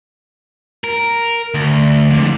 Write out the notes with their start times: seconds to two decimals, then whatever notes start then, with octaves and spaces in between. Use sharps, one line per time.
0.84 A#4
1.54 D2
2.10 F2 D3